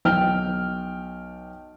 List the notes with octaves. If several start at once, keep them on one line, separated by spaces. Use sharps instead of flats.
B1 G5 F6